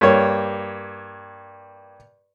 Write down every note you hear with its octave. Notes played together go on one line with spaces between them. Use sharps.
G2 A#3 C#5